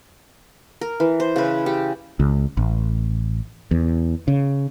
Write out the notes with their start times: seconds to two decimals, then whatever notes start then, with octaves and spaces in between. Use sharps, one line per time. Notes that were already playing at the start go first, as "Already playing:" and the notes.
0.81 A#4
1.00 E3
1.20 C5
1.36 C#3 B4
1.66 G4
2.20 C#2
2.57 A1
3.71 E2
4.28 C#3